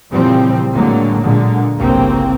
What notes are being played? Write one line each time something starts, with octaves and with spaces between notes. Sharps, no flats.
A#2 C#3 E3 F3 G3 C4
A2 D3 F#3 G#3 A#3
A#2 D3 G#3
G1 C2 C#3 A#3 C4